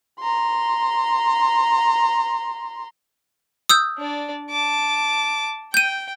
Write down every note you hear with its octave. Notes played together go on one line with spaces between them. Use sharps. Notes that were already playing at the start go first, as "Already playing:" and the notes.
A#5 C6
D#6 E6 G6
D4 D5
A5 D6
G5 G6 D#7